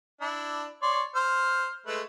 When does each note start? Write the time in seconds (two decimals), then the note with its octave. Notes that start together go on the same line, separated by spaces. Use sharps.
0.21 D4 E4
0.82 C#5 D5 C6
1.15 C5 F6
1.87 G#3 A3 B4